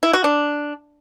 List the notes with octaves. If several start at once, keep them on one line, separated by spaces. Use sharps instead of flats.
E4
F#4
D4